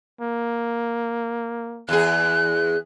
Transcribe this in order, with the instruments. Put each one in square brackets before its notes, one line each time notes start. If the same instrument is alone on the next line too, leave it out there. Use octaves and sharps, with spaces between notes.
[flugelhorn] A#3
[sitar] E2 G#4 [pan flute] F#6